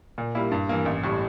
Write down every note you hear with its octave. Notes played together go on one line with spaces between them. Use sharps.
A#2
G3 A#3 E4
G2
E3 A#3
A1
A2 G3